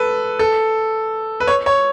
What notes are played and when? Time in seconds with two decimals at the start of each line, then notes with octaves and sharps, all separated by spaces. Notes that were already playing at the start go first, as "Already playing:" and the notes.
Already playing: A4 B4
0.39 A4
1.40 B4
1.47 C#5
1.66 C#5